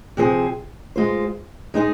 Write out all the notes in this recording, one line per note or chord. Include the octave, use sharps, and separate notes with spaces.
C3 F3 C4 G#4 C5
G#3 F4 C5
G#3 D#4 G#4 C5